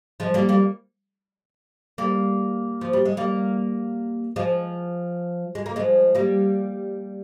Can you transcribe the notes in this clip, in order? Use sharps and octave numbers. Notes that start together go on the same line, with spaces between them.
F3 G#3
G3 A#3
G3 A#3
G3 A#3
F3
G3
G#3
G3 A#3
F3 G#3
G#3
A#3
F3 G#3
G3 A#3